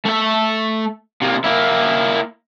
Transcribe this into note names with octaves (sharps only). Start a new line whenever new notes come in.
A3 E5
C3 A#3
A#3 E4